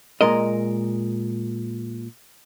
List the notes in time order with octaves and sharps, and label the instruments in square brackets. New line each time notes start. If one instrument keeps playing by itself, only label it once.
[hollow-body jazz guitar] A#2 G#3 A#4 D#5